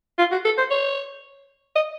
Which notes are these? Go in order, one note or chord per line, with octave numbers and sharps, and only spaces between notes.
F4
F#4
A4
C5
C#5
D#5